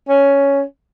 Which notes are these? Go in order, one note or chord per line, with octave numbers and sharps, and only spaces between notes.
C#4